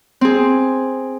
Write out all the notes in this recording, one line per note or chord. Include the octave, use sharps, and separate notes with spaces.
C4 G#4